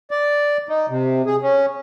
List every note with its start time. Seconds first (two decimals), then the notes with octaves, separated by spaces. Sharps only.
0.11 D5
0.69 D#4
0.89 C3
1.26 G#4
1.42 C#4